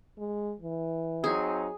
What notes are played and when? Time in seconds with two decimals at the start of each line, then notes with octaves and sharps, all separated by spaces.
0.18 G#3
0.60 E3
1.24 F#3 C4 D#4 G#4